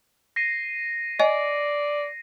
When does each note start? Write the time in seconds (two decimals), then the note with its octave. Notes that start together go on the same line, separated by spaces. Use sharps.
0.36 A#6 C7 D#7
1.20 D5 D#5 G#5